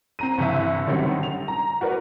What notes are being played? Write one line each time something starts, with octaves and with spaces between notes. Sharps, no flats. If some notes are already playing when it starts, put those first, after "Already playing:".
C4 A#5 D#7
G1 C2 E3 E5
D3 D#3 F#3 G3 C4 C#4
F7
A#5
F#4 A#4 B4 D5